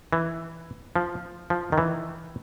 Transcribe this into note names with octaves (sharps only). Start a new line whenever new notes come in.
E3
F3
F3
D#3
E3